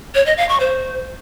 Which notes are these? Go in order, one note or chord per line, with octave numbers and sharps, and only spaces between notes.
C#5
D#5
F5
C#6
C5